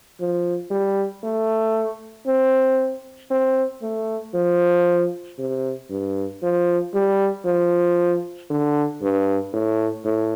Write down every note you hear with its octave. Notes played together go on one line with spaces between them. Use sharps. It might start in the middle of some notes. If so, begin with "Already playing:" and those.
F3
G3
A3
C4
C4
A3
F3
C3
G2
F3
G3
F3
D3
G2
A2
A2